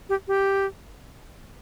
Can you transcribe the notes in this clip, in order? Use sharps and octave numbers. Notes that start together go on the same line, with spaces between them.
G4
G4